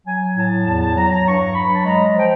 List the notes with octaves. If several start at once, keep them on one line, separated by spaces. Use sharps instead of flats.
F#3 G#5
A2 A5
E2 A5
A5
F#3 A#5
A#5
G2 C#6
F#3 B5
A5
G#3 A#5
F3 G5